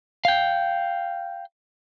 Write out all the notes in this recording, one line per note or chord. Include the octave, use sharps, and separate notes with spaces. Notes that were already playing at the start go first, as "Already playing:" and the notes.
F5 G5